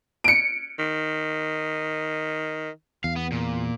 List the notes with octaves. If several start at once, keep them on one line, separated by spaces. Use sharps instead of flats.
C#7 D7
D#3
E2 F5
B3
A#2